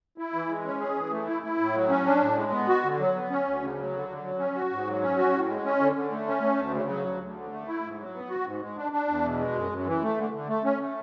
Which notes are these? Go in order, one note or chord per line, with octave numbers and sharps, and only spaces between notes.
E4
E3
G#3
C#4
G#4
E3
A3
E4
E4
A2
F#3
C#4
D4
A2
G#3
B3
F#4
D3
F#3
B3
C#4
D2
C#3
F#3
D3
D3
F#3
C#4
F#4
G#2
F#3
C#4
F#4
A2
G#3
C#4
D3
D3
A3
C#4
A3
D2
C#3
F#3
D2
D2
D3
A3
E4
G#2
F#3
B3
F#4
G#2
G#3
D4
D4
E2
B2
G#3
F#2
F#2
E3
A3
D3
D3
A3
C#4
A3